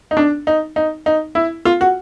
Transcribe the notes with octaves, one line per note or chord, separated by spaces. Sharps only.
D#4
D4
D#4
D#4
D#4
E4
F4
F#4